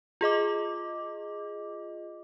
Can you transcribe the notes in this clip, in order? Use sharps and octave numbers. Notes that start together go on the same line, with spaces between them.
F4 G#4 D#5 D6